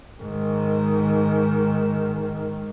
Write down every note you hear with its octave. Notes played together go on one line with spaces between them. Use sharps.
G#2 D#3